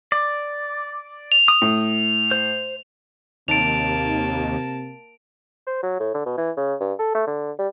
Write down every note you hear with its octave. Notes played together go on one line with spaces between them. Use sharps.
D5
F7
D#6
A2
C5
D#2 C3 A#3 A5 D7 F7
C5
F#3
A2
D3
B2
E3
C#3
G2
A4
A3
D3
G3